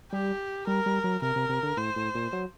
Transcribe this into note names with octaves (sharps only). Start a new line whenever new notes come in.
G3 G4
G3 A#4
G3
F#3
C3 A#4
C3
C3
D3
A2 C5
A2
A#2
F#3